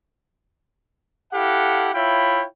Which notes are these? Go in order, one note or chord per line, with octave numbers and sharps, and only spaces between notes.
E4 G4 A4 F5 F#5
E4 F4 C#5 E5 G5 B5